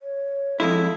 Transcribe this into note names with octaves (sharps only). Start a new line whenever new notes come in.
C#5
F2 G#3 E4 A4